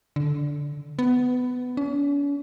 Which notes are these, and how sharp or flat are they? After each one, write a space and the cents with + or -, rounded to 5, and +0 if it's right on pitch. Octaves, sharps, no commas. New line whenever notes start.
D3 -10
B3 +15
C#4 +45